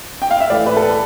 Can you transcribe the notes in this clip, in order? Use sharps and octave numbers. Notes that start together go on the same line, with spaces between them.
G5
F5
E5
A2 E3 A3 D5
B4
A4
B4